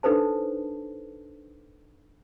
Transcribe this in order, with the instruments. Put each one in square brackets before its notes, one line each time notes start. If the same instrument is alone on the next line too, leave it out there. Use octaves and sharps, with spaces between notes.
[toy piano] D4 D#4 A4 B4 C5 A5